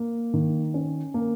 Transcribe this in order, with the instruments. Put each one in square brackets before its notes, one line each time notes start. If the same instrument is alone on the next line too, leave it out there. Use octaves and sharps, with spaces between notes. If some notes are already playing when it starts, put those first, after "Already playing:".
Already playing: [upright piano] A#3
D#3
C#4
A#3